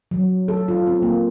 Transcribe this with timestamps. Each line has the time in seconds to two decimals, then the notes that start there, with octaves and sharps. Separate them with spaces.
0.11 F#3
0.48 A4
0.68 F4
0.87 C4
1.02 A#3